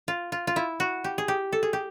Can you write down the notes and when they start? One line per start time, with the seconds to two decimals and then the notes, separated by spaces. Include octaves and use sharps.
0.08 F4
0.32 F4
0.47 F4
0.56 E4
0.80 F#4
1.04 G4
1.18 G#4
1.28 G4
1.52 A4
1.63 G#4
1.73 G4